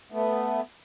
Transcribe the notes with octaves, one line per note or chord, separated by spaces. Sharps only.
A3 B3